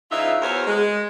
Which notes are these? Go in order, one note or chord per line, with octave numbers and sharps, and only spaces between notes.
C#3 E3 D#4 F4 E5
E2 B3 F#4 A#4 C5 C#5
G#3